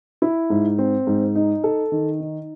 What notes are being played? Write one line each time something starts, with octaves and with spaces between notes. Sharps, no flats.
E4
G#2
C4
G#2
D#4
A4
D#3
D#4